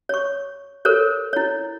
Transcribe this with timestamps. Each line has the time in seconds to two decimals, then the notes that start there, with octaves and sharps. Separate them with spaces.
0.09 C#5 C#6
0.85 A4 A#4 C5 C#5
1.33 E4 C#5